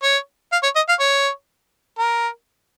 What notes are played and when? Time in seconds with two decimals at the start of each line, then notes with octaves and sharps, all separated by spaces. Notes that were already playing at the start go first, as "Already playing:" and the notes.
0.03 C#5
0.52 F5
0.63 C#5
0.76 D#5
0.89 F5
1.00 C#5
1.98 A#4